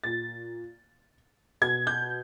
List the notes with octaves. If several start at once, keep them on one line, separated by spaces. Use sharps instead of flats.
A#2 A6
B2 G#6
G6